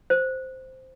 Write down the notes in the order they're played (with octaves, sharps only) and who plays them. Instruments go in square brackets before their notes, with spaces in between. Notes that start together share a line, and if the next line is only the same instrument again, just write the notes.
[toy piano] C5